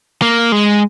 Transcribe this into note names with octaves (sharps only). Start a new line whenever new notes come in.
A#3
G#3